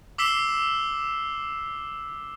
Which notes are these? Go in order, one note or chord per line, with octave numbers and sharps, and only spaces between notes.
D6 E6 B6 C7 E7 G7